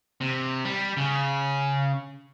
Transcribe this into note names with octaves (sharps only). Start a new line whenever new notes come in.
C3
G3
C#3